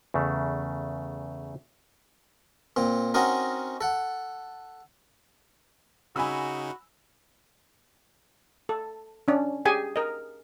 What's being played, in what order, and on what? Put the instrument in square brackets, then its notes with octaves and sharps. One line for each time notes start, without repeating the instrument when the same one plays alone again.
[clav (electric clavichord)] E2 C#3 A3
[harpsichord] A#2 C4
C4 C#4 D#4 F#4 A#4
A4 F#5
[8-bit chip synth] C#3 D#4 [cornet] F#4 [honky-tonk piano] G#5 B5 E6
[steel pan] A4
C#4 D4
G4 G#4 G#5
A#4 D#5